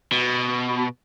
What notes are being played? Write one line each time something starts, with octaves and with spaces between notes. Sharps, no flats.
B2